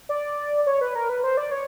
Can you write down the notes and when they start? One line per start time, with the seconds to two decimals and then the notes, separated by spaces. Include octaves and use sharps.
0.09 D5
0.67 C#5
0.81 B4
0.95 A#4
1.09 B4
1.24 C5
1.37 D5
1.51 C#5